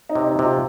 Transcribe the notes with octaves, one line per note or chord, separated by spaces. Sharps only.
D#4
C3
D#4
C3
F4